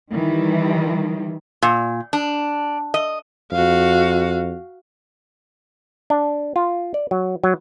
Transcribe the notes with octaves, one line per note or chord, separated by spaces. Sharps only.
D#3 E3 G3
A#2
D4
D#5
F2 F#4 F5
D4
F4
D5
F#3
F#3